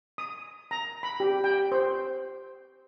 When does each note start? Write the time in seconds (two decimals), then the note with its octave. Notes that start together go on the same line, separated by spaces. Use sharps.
0.18 D#6
0.71 A#5
1.03 B5
1.20 G4
1.44 G5
1.72 C5